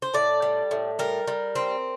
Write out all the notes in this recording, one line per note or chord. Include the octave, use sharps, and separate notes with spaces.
C5
A2 D5
G3
A2
G3 A#4
G3
C4